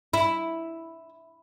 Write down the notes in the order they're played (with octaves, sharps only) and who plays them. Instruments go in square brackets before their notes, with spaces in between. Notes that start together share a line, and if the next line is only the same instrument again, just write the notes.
[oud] E4